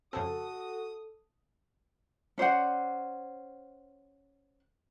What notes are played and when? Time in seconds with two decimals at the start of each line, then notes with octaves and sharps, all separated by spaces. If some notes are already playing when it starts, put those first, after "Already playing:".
0.13 F2 C#3 C4 F#4 A4 D#6
2.38 C#4 C5 D5 F#5